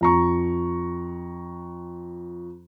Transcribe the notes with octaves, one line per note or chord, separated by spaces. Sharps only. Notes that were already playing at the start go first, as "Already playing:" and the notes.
F2 A#5 C#6